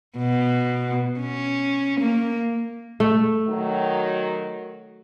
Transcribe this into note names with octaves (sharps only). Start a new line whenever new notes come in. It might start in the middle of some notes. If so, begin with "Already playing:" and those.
B2
C#4
A#3
A3
D#3 F#3